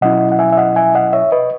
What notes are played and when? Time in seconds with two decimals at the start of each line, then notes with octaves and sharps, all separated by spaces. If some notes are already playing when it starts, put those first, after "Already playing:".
0.01 B2 F#3 C#4 E4 D#5 F#5
0.32 F#5
0.39 E5 G#5
0.52 E5
0.57 D#5 F#5
0.76 E5 G#5
0.95 D#5 F#5
1.13 C#5 E5
1.32 B4 D#5